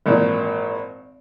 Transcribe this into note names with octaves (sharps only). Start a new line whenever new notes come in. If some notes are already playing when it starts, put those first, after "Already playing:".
G#1 A#2 E3